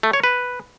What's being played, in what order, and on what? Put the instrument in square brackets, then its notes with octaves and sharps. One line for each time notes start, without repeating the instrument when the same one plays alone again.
[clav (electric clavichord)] A3
C#5
B4